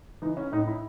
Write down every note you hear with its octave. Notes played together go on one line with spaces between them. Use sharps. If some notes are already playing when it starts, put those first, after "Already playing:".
E3 D#4
C#4
A2 D#4
E4